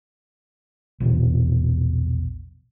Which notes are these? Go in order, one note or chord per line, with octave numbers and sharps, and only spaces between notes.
A#1 E2 B2